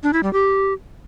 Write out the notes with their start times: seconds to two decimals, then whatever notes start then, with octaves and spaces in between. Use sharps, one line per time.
0.03 D4
0.13 E4
0.23 G3
0.33 G4